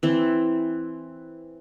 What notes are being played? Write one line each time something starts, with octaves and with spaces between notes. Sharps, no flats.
E3 C4